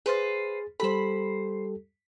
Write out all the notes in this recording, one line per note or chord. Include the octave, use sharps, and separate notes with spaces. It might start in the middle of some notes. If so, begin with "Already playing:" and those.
G#4 B4 C5 F5 A6
G3 G4 A4 C5 B5